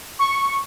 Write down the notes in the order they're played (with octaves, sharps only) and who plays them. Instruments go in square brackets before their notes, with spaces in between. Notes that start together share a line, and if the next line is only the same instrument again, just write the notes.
[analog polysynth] C#6